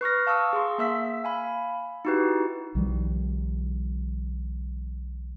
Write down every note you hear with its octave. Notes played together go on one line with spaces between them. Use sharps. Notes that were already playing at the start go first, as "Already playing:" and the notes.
B4 C#6 F6 A#6
F5 A5 C#6 D#6 E6
G#4 C6
A#3 E5 E6 B6
F5 G#5 B5
D#4 E4 F#4 G4 B4
B1 D#3 F3 G3